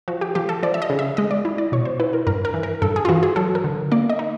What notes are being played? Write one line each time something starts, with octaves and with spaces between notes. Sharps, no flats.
F3 F#4
G4
F3 G4
A4
F3 D5
E5
D#5
C#3
E5
G#3 D#5
D5
E4
D5
B2 C#5
C5
E4 B4
A#4
G2 A#4
A#4
E3
A#4
G2 A4
G#4
F4
E3 F#4
G#4
F#3 A4
A#4
D3
A#3 D5
D#5
D#4